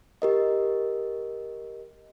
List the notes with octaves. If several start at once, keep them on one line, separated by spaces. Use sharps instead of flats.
G4 A#4 D#5